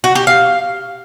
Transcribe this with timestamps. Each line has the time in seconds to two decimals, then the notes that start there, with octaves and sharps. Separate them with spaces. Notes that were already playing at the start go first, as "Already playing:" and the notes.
0.04 F#4
0.15 G4
0.27 F5